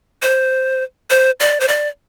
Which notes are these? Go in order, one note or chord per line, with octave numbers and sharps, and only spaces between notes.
C5
C5
D5
C5
D5